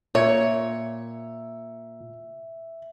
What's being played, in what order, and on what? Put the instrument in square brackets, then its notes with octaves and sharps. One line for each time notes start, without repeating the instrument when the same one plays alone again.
[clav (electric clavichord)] A#2 [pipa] C#5 [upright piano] E5